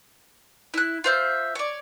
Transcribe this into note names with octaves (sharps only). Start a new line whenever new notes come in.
E4 F#6
F4 C5 E5
C#5 D5